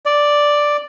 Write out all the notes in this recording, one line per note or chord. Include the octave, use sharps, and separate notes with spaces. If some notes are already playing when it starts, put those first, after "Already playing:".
D5